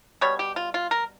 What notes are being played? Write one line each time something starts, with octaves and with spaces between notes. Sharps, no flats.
B2 G3 C#5
G4
F4
F4
A#4